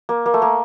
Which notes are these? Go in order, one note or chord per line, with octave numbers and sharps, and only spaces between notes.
A#3
A#3
A3
A#3